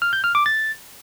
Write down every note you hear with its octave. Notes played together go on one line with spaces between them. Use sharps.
F6
G6
F6
D6
A6